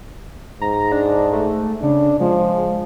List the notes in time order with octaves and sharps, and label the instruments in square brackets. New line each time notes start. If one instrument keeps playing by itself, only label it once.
[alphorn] G#2 [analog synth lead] A#5
[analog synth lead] D4
A3
[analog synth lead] C#3 [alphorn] D4
[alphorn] F3 [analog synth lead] G#3